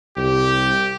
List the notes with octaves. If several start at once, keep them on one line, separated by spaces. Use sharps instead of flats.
C2 G4